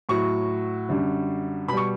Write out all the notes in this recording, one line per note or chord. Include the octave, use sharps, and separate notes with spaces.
A2 F#3 C#6
F#2 D3 G3
B2 G3 B5 C#6